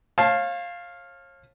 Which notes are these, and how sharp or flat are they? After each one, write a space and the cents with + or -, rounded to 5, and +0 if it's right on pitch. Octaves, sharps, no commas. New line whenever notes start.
C#5 -40 F5 +0 A5 +0